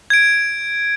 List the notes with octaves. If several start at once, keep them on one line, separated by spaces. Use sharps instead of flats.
G#6 D7